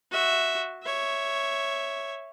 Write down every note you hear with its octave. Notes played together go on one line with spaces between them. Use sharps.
F#4 E5
C#5 E5